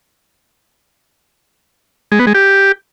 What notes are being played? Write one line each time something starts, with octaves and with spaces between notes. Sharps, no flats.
G#3
B3
G#3
G4